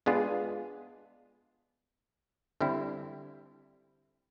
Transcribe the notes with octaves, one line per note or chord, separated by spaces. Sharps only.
G#3 B3 D4 F4 G#4
D3 G3 C4 E4